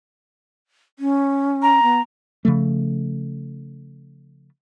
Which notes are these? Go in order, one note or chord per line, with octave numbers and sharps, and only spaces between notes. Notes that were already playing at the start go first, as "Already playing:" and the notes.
C#4
A#5
B3
C#3 F3 A3